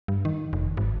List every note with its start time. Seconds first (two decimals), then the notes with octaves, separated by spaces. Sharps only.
0.08 G2
0.25 D#3
0.53 F1
0.77 G#1